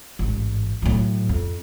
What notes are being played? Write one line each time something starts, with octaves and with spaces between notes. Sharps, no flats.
A1 G#2
A2 F#3
F2